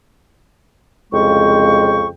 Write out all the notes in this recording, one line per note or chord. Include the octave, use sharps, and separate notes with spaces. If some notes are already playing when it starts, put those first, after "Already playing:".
C2 F2 C#3 G#3 G5 C#6